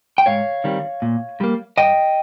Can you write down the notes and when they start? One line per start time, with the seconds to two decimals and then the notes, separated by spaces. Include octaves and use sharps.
0.18 G5
0.26 G#2 C#5 F5
0.64 D#3 G3 C4
1.02 A#2
1.41 G3 A#3
1.78 G2 D#5 G5